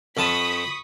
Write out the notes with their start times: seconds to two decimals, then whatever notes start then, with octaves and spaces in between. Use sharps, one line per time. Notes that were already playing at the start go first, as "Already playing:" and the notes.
0.17 F2 A5 B5 C#6 D#6 B6